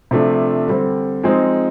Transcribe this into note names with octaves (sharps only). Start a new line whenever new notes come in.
C3 F3 A3 D4 F4
D3 G3 C4
F3 G#3 C4 D#4